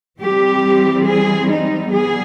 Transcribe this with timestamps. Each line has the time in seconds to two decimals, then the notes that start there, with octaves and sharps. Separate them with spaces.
0.21 E3 G3 C4 G4
1.06 G#4
1.49 D#4
1.92 G3 B3 G#4